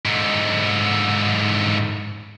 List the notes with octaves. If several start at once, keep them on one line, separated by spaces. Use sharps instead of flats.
G#2 D3